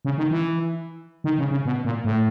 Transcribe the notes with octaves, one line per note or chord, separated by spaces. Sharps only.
C#3
D#3
E3
D#3
C#3
C#3
B2
A#2
A2